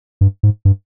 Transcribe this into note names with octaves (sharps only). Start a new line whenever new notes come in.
G2
G#2
G2